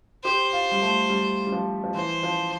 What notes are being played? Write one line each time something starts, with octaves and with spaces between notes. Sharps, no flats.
G4 C5
F4
G3
A3
G3
G3
F3
F3
E3 C5
F3